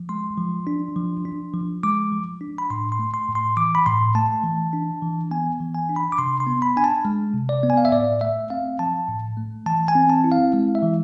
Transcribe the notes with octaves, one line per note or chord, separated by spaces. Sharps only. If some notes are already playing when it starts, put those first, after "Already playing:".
Already playing: F3
G#3 C6
F3
D4
F3
D4
F3
G#3 D6
F3
D4
B5
A2 C6
C6
A3
C6
A2
C6
E3 D6
B5
A2 C6
A3 A5
E3
D4
E3
B3 G#5
E3
G#5
D4
B5
D6
C3 C6
C6
B3
B5
D4 G#5
A5
G#3
C3
D5
B3
G#5
F5
E5
A2 D5
A3 E5
C4 F5
F3 A5
A2
A3
E3 A5
G#5
C4
A5
E4
F5
G#3
E5
E3